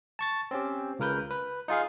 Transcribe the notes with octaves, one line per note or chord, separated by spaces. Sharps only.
A5 C#6 A6
C4 C#4 G4
C#2 C#3 A#4 B4 G6
B4
D#4 F4 G#4 F5